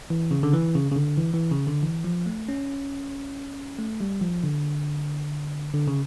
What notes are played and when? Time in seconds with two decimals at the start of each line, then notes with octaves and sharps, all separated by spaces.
0.10 E3
0.31 C#3
0.43 D3
0.53 E3
0.75 C#3
0.91 C#3
0.96 D3
1.18 E3
1.34 E3
1.51 C#3
1.67 D3
1.83 E3
2.04 F3
2.26 A3
2.49 C#4
3.79 A3
4.01 G3
4.21 F3
4.44 D3
5.74 D3
5.88 C#3